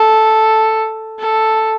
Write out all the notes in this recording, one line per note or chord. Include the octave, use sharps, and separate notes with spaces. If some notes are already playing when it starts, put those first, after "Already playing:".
Already playing: A4
A4